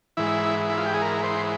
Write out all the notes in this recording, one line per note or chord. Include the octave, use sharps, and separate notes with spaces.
G#2 E3 E4
E4
F4
G4
G#4
A#4
C5